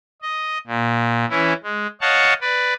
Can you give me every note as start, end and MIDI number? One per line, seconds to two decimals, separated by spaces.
0.22 0.58 75
0.67 1.25 46
1.30 1.53 52
1.30 1.53 61
1.30 1.53 64
1.63 1.87 56
2.01 2.34 73
2.01 2.34 75
2.01 2.34 77
2.01 2.34 78
2.01 2.34 81
2.01 2.34 85
2.41 2.74 71
2.41 2.74 74